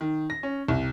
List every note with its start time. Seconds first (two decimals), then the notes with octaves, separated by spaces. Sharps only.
0.01 D#3
0.30 A#6
0.43 C#4
0.68 C2